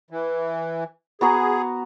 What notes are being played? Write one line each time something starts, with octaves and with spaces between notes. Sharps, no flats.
E3
B3 F#4 G#4 A#5